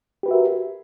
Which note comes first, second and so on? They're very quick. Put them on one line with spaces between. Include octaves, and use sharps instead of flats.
G4 B4 F#4 E5 A#4